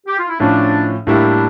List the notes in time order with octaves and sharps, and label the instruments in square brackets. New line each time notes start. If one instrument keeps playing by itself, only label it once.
[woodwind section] G4
F4
E4
[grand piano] A2 F3 C#4 [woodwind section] D4
[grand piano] A2 G3 A#3 E4 G4 [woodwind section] D4